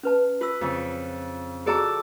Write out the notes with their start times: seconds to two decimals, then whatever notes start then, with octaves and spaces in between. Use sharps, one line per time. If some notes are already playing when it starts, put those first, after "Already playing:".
0.03 C#4 B4 A5
0.41 F4 B4 E6
0.61 F2 C#3
1.66 F#4 G#4 A4 D5 A#5